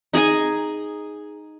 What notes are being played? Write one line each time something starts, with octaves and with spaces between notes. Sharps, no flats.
D#4 G#4 D#5 G#5